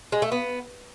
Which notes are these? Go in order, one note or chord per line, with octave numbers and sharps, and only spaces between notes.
G#3
A3
B3